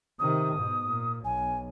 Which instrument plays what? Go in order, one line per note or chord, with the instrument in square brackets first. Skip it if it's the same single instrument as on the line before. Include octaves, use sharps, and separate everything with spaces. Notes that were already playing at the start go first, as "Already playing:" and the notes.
[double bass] C3 D#3 [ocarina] D#6
[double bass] G#2 B2
A#2
[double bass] B1 [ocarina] G#5